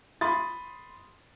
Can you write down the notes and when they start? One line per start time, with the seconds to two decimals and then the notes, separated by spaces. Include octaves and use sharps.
0.21 B5 C6 D#6 A6